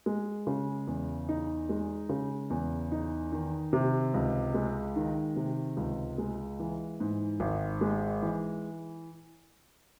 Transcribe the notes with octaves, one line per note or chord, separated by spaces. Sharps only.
G#3
C#3
E2
D#4
G#3
C#3
E2
D#4
D#3
C3
C#2
G#3
D#3
C3
C#2
G#3
E3
G#2
G#1
G#3
E3